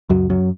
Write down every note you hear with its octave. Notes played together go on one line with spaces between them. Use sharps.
C#2 F#2 F#3
F#2 F#3